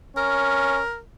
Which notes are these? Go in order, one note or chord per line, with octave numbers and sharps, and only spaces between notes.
C#4 A#4